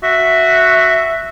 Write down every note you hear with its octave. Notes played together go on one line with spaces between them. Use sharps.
F#4 E5